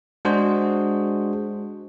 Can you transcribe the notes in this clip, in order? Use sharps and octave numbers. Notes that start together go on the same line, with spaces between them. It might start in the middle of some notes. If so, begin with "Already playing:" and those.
G#3 D4 F#4 G#4 C5